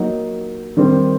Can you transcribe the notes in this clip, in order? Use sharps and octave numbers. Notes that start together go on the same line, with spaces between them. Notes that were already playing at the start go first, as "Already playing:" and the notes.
Already playing: F#3 A#3 D#4
D#3 G3 C4